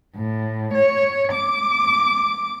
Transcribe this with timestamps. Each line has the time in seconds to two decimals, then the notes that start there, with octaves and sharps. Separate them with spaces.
0.15 A2
0.75 C#5
1.32 D6